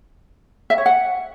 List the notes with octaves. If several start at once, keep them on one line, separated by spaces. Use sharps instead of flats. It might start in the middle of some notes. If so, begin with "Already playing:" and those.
E5
C#5
F#5